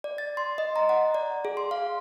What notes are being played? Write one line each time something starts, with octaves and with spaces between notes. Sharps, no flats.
D5
A6
C6
D#5
A#5
F#5
D5
G#4
C6
F5